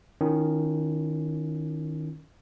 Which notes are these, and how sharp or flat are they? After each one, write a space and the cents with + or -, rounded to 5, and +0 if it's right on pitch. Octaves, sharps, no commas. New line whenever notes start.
D#3 +0 C#4 +5 E4 +45